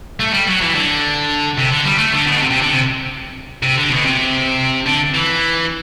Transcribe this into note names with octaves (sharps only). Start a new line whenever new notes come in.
A3
G3
F#3
E3
D3
C3
D3
G3
A3
D3
B2
D3
C3
C3
D3
C3
C3
D3
B2
C3
D3
E3